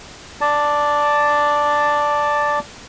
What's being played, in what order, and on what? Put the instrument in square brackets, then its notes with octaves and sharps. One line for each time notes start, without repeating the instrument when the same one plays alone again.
[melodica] D5 A5